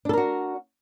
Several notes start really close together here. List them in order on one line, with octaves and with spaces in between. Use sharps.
D4 A4 A#4 F#4